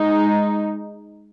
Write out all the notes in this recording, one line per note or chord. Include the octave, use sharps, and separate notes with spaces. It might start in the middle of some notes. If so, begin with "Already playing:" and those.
Already playing: G#3 D#4